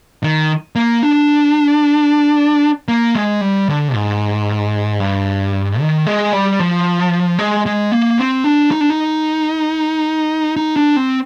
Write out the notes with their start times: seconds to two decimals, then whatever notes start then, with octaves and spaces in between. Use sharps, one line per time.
0.24 D#3
0.75 A#3
1.03 D4
2.88 A#3
3.15 G#3
3.41 G3
3.68 D3
3.95 G#2
5.00 G2
5.80 D#3
6.07 G#3
6.33 G3
6.59 F3
7.39 G#3
7.66 G#3
7.92 A#3
8.19 C4
8.44 D4
8.71 D#4
8.81 D4
8.90 D#4
10.57 D#4
10.76 D4
10.97 C4